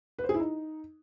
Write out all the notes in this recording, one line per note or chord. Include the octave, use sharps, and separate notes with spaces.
B4
C5
G#4
E4
D#4